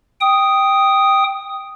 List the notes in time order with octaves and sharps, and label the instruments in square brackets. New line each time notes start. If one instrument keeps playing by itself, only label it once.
[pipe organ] G5 D#6